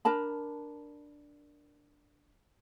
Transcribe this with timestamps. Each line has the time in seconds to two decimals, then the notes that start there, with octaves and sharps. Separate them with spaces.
0.05 D4 A#4 A5 B5